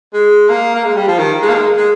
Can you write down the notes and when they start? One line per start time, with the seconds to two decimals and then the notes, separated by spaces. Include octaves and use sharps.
0.14 G#3
0.49 A#3
0.75 A#3
0.84 G#3
0.95 G3
1.07 F3
1.19 D#3
1.42 G#3
1.49 A#3
1.54 G#3
1.77 G#3